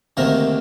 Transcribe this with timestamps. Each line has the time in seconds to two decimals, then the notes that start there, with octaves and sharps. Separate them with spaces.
0.17 D2 C3 D#3 A#3 A#4